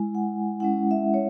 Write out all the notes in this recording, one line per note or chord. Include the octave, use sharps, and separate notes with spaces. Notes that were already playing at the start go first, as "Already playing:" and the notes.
Already playing: G#3 E4 G#5
F#5
G#3 C#4 E4 F#5
E5
C#5